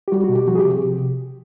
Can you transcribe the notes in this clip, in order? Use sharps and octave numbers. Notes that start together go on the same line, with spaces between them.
G4
G3 F#4
F#4
B2
G4
F3 F#4
G#4
G4
C3